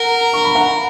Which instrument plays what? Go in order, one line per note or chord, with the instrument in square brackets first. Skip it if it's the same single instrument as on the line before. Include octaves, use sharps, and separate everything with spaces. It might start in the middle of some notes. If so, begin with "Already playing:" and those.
Already playing: [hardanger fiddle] A#4 [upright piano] F#5 A#5
[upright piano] C#6
B5
F#5 A#5